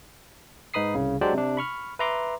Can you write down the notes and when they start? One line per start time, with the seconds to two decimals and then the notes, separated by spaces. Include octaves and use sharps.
0.74 G#2 D#4 B4 B5 D#6 C7
0.95 C2 C#3
1.21 F#3 G#3 D4 G4 C5 D5
1.33 C3 D4
1.57 B5 C#6 F6
1.99 B4 E5 A#5 C6 D6